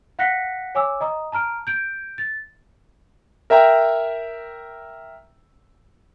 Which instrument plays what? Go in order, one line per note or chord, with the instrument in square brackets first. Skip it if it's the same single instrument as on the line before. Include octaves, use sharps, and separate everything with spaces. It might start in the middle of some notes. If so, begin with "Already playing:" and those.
[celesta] F5 F#5 F#6 A#6 B6 C#7
C#5 G#5 D6 E6
D#5 A#5 D#6
A5 A#5 F6 D7
G6 D7
A6
[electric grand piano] A#4 E5 G5 A#5